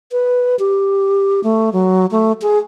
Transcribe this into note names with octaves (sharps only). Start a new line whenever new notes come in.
B4
G4
A3
F#3
A3
G#4